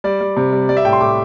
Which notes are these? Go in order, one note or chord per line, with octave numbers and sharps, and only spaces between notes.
G3 D5
G3
C3
G3
G3 D5
E5
A2 G5
C6
A2 D6